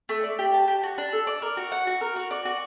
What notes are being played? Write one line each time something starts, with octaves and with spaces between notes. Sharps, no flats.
A3
D5
G4
A5
G4
F#4
D4
A4
D5
A#4
F#4
F#5
F#4
A#4
F#4
D5
F#4